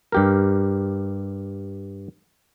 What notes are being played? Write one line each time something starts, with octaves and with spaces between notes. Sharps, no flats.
G2 G4 A#4